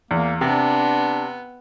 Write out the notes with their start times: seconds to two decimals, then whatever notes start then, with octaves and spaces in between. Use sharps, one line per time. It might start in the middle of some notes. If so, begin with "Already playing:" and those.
0.11 E2 A#3
0.41 C3 B3 D4